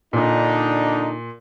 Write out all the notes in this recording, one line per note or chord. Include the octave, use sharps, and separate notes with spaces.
A#2 D3 D4 D#4